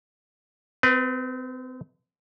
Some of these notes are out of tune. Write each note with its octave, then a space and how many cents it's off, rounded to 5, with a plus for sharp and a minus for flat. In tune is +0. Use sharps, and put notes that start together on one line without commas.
C4 -35 B4 +0